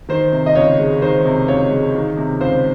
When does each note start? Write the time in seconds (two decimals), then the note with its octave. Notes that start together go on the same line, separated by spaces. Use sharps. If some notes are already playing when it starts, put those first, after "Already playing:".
0.09 D#3 C5
0.32 C3
0.46 D#5
0.55 C#2 C#5
0.79 G#3
1.02 D#3 C5
1.26 C3
1.48 C#2 C#5
1.72 G#3
1.95 D#3
2.17 C3
2.40 C#2 C5